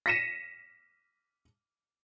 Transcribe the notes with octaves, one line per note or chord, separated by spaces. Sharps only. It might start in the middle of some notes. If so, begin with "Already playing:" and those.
A#6 B6 C#7 D#7 E7